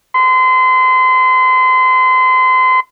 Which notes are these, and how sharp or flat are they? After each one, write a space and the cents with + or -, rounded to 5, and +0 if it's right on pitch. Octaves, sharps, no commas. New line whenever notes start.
C6 -30